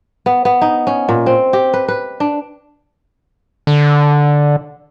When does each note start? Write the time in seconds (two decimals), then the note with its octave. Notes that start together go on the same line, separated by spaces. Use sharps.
0.26 B3
0.45 B3
0.61 D#4
0.87 C#4
1.09 A#2
1.26 C4
1.53 G4
1.73 B4
1.88 B4
2.20 D4
3.67 D3